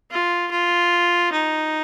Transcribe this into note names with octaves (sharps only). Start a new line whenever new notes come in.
F4
F4
D#4